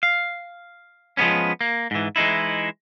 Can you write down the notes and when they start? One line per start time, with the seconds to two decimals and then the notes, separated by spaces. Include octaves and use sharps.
0.03 F5
1.17 F3 G#3 A#3 B3 C#4
1.61 A#3
1.91 G#2 E3
2.16 E3 G#3 D#4 E4